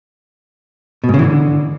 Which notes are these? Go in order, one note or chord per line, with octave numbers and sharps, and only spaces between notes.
B2
G#2
C#3
E3
D3